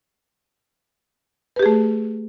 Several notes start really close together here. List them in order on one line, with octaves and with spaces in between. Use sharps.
B4 G4 G#4 A3